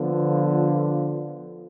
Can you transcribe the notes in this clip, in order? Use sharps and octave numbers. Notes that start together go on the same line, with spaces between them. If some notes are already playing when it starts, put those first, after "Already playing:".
Already playing: D3 F3 B3 F4